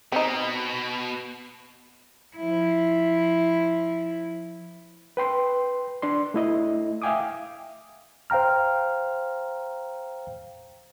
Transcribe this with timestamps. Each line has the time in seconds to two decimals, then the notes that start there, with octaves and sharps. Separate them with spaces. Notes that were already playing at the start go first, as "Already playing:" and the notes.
0.12 B2 C4 D#4
2.37 F3 E4
5.17 B4 G5 C6
6.02 D4 D5 C6
6.34 A3 E4 D#5
7.02 E5 F5 G5 G#5 D6 D#6
8.30 C5 F5 G5 A#5 F6